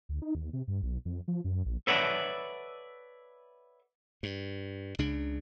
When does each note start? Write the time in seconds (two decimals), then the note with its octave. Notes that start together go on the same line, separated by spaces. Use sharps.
0.09 D2
0.22 D#4
0.35 D#2
0.53 C3
0.68 G2
0.83 B1
1.05 F2
1.28 F3
1.44 F#2
1.66 A#1
1.87 A4 B4 C#5 D5 E5 F#5
4.23 G2
4.99 C#2 C#3 D4